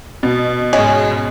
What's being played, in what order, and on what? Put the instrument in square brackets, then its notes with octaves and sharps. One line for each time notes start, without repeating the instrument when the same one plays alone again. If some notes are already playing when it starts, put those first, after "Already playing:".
[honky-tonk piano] B2
[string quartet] G#2 C#3 G#3 [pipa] C#4 G#4 D#5